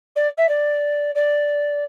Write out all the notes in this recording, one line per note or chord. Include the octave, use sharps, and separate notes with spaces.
D5
E5
D5
D5